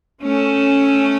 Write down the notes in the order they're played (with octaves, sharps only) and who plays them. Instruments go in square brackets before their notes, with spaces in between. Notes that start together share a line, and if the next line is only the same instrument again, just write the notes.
[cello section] A3 C#4